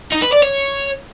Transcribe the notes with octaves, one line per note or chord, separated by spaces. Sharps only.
D#4
B4
D5
C#5